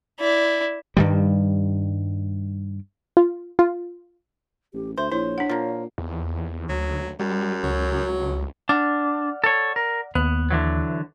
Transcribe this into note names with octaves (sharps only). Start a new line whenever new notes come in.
E4 D5
G2 D#3 G3
F4
F4
A1 G4
D2 C5 E5
A#1 E4 C5 C#5
D4 F#5
A#2 F3 A#3
E2
D2 F#3
F#2 G3
C#2 F#3
D4 D5 F#5 F6
A4 C#5
A#4
D#2 B3 F#6
D3 E3 F#3